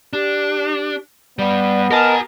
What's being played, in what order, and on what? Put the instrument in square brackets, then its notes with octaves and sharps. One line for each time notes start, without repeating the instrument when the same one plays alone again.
[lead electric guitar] D4 [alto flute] G4
[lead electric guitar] G2 G3 [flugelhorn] B3 [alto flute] D5
[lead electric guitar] G4 G#5 [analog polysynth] A#4 A5 [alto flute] D#5